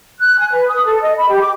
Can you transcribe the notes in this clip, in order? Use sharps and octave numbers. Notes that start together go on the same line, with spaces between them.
F#6
G#5
B4
D#6
A4
D#5
B5
G4
D6